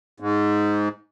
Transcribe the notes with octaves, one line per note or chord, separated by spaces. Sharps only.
G#2